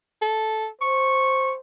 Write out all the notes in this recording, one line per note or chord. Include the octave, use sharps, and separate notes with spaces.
A4
C5 C#6